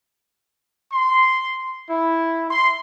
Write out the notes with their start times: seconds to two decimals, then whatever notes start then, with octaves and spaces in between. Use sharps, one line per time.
0.92 C6
1.89 E4
2.50 C6